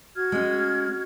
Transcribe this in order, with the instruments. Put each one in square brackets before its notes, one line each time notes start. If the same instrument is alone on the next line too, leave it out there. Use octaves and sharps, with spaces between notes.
[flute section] F#4 F6 G#6
[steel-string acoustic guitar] G#3 C#4